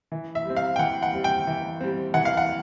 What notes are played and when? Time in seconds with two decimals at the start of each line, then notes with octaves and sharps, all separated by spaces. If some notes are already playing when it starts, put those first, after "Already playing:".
0.12 E3
0.35 E5
0.45 G3 C4
0.56 F5
0.76 G5
0.79 E3 F#5
1.03 F#5
1.13 G3 C4
1.24 G5
1.47 E3
1.81 G3 C4
2.14 E3 F#5
2.25 F5
2.37 F#5